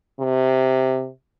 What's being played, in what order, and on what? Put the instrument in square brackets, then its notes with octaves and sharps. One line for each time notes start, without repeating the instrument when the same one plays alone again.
[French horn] C3